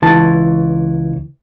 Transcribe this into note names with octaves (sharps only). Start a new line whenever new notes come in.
C#2 E3 A5